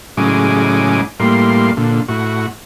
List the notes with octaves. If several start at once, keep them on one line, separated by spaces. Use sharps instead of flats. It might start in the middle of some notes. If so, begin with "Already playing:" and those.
A2 C#3 F#3 G#3 G#5 D6
A2 G3 A#3 C6
A#2 D3
A2 F#4